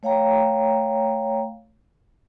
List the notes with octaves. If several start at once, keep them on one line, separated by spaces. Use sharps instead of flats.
A3 C#5 F5 G5 A#5